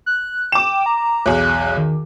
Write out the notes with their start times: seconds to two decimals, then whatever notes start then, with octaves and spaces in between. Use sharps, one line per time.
0.06 F#6
0.52 G5 D6 E7
0.86 A#5
1.26 B1 E2 F#6
1.77 D#3